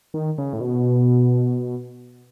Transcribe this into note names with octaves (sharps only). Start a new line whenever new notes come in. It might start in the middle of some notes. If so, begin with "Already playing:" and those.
D#3
C#3
A2
B2